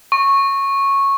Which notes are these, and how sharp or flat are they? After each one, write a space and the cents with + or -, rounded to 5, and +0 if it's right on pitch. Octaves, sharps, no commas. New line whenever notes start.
C#6 -10